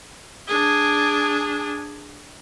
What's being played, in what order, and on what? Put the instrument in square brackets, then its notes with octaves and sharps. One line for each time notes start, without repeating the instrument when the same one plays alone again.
[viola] D4 G#4